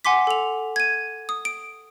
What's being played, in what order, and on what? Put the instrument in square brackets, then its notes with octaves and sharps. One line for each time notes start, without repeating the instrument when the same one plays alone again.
[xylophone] F#5 G#5 C6 D6 B6
A4 F7
G#6 D#7
D#6
D7